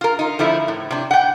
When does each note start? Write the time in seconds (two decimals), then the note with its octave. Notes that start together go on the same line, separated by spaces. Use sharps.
0.01 F4 A#4
0.19 D#4 F4
0.39 D3 F3 A3 E4
0.68 A2
0.91 C3 D4
1.11 F#5 G5